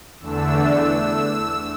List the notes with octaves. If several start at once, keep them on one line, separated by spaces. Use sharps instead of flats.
E2 D3 A3 D4 E6